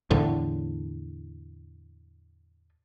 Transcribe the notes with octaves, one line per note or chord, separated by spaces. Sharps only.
E2 A2 D3